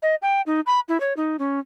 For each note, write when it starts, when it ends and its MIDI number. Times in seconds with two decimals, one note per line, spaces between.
0.02 0.15 75
0.22 0.42 79
0.46 0.60 63
0.66 0.80 83
0.88 1.00 64
1.00 1.13 73
1.17 1.37 63
1.39 1.60 61